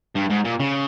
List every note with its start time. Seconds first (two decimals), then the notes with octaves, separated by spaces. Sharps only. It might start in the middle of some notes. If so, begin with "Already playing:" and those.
0.16 G2
0.30 G#2
0.45 A#2
0.60 C#3